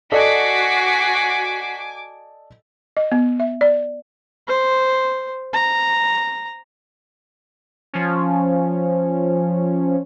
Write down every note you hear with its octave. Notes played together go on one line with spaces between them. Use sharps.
F#4 A4 D5 D#5 G#5 D6 B6 C7
D#5
B3
E5
D5
C5
A#5
F3 C#4